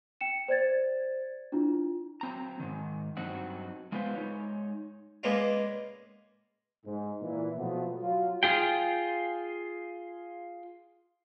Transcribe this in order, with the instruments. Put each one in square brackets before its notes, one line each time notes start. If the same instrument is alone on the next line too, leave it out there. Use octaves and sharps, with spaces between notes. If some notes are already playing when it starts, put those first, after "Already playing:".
[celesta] G5 C#7 E7
C5 D5 G#6 A6
D4 E4 F4
[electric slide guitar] F#3 C4 A#5
G#2 D#3
G2 F#3 C4 D#4 F#4
G#3 B3 F4 B4 C5 F5
G#3 D#4 C#5
[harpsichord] G#3 A#3 B3 C#4 D4 F4
[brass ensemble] G#2
A#2 E3
B2 F3 F#3 A3 B3
F#3 F4
[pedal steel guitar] F4 G#4 G5